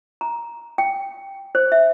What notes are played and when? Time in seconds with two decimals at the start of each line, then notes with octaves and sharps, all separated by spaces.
0.21 A#5
0.78 G5
1.55 C5
1.72 E5